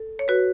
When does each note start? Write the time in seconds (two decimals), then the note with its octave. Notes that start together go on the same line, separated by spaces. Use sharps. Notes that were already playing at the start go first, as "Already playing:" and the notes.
Already playing: A4
0.19 C#5
0.28 F#4 B4